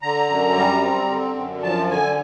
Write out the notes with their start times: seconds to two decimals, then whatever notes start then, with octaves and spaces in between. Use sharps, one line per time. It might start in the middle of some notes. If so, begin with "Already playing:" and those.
0.02 D3 A#5
0.29 F#2
0.56 G3
0.82 C4
1.09 D3
1.36 F#2
1.63 F3 A5
1.89 D3 G#5